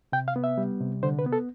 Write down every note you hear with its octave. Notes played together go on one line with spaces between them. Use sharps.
C3 G5
F5
B3
E5
G3
C3
D3 C5
B4
B3
A4